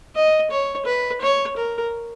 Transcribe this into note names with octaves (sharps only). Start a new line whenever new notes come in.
D#5
C#5
B4
C#5
A#4